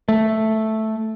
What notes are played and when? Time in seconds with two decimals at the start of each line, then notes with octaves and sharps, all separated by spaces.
0.08 A3